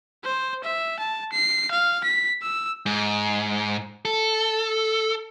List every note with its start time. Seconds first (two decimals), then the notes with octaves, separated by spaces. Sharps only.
0.24 C5
0.64 E5
0.99 A5
1.32 C7
1.71 F5
2.04 B6
2.42 E6
2.86 G#2
4.05 A4